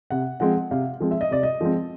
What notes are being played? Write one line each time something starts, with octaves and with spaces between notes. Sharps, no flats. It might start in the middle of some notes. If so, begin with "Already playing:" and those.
C3 F#5
F3 G#3 C4 F#5
C3 F5
F3 G#3 C4
E5
D#5
C3 D5
D#5
F3 G#3 C4